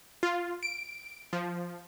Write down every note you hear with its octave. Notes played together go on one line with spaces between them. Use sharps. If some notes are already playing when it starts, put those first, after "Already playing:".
F4
D7
F3